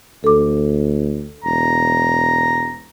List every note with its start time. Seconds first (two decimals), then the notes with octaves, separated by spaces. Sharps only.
0.24 D2 A4 D6
1.44 E1 A#5